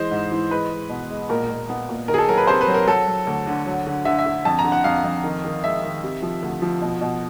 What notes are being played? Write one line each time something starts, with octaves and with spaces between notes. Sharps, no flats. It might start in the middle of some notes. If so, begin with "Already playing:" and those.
Already playing: E3 G#3 C5
G#2
E3
G#3 B4
G#3
B2
G#3
A#2 A#4
A#2
B3
A#2
D#3 A#4
G#4
A4
F#3 A#4
B4
C3 C5
B4
F#3
A#4
F#3 A4
F#3
D2
D3
F#3
D3
D3 E5
E5
D3
F2 A5
A#5
D3
F#5
F2 F5
F2
D#3
D#3
G#3 E5
D#3
C3
F3
D2
F3
B2
B2